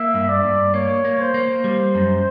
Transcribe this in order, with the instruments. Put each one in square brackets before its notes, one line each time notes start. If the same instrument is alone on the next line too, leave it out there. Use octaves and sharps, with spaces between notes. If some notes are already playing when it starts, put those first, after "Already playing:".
Already playing: [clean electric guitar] A#3 [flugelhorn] E5
[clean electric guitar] G2
[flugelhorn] D5
[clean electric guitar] G2
[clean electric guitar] A#3 [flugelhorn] C#5
[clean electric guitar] A#3
[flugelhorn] C5
[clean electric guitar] A#3
G3
F#2